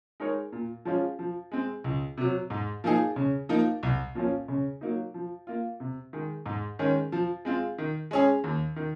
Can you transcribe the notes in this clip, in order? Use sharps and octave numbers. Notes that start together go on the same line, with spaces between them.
G#3 D#4 A#4 C#5
A#2
F3 G#3 C#4 F4
F3
G#3 C4
C#2
C3 F#3
G#2
F3 A#3 D#4 G#4
C#3
F3 A#3 D#4
C2
A#2 F3 A#3 C#4
C#3
F#3 A#3 D#4
F3
A#3 F4
C3
D#3 G#3
G#2
D#3 G#3 C#4
F3
G#3 C4 F4
D#3
G#3 C#4 G#4
D#2
D#3